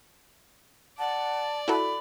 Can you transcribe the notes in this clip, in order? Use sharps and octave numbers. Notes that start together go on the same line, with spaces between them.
D5 F#5 A5
E4 F#4 A4 B5